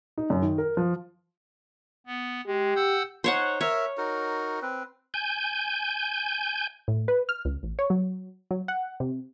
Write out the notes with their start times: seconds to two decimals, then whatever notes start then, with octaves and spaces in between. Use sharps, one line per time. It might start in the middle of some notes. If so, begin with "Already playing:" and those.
0.18 D#4
0.30 F#2
0.42 D#3
0.58 A#4
0.77 F3
2.06 B3
2.46 G#3 G4
2.76 F#5 E6 G6
3.24 D#4 C5 C#5 F#5
3.61 A#4 C#5 E5
3.97 D#4 F#4 A#4
4.62 C4 B4
5.14 G#5 G6
6.88 A2
7.08 B4
7.29 F6
7.45 C#2
7.63 A1
7.79 C#5
7.90 F#3
8.51 F#3
8.68 F#5
9.00 C3